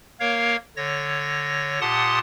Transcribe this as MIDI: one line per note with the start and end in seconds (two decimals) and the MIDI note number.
0.20 0.56 58
0.20 0.56 70
0.20 0.56 73
0.20 0.56 77
0.77 1.80 50
0.77 1.80 73
0.77 1.80 94
1.81 2.19 46
1.81 2.19 67
1.81 2.19 78
1.81 2.19 81
1.81 2.19 84
1.81 2.19 87